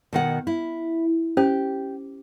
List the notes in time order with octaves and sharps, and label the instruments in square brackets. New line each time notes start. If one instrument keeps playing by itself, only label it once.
[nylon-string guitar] B2 D#3 F#5
E4
[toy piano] C#4 C5 [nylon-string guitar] G4